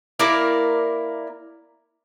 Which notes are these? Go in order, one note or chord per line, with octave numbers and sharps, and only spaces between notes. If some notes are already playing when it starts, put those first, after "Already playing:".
A#3 E4 A#4 D5